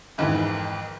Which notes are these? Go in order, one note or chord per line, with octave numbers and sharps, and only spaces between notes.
F2 G#2 D#3 E3